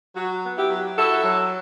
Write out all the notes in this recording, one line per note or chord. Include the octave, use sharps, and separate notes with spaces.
F#3 F#4
B3
E4 G4
F#3
E4 F#4 A4
F#3